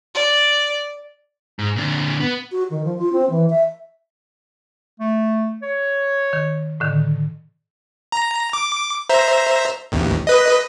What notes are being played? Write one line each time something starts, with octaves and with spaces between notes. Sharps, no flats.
D5
G#2
A#2 D3
B3
F#4
D#3
F3
F4
C4
E3
E5
A3
C#5
D#3
A2 D3 D#3
A#5
D6
C5 E5 A#5
A1 D#2
B4 D#5